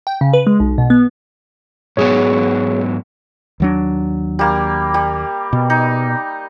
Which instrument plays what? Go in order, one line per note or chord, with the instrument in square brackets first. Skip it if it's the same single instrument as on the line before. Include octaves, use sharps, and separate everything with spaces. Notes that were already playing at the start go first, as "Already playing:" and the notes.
[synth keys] G5
C#3
B4
G#3
B1
B2
B3
[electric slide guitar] G#2 F#3 B3 [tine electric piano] G#4 C#5
[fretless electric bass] D#2 F#3 D4
[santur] G3 A#3
G3
[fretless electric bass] B2
[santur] D#4